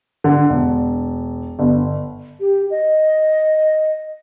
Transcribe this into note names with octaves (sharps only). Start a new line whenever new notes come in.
D3
E1
G1
G4
D#5